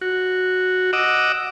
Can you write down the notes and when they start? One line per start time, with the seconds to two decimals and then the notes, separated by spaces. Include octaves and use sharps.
0.01 F#4
0.93 D#5 F#5 D6 E6